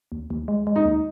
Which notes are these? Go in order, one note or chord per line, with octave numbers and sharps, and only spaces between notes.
D#2
D#2
G#3
G#3
D#4
D#2